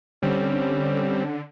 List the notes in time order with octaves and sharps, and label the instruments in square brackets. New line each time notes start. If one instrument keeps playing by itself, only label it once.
[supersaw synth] D3 [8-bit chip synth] G3 C4 [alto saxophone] C#4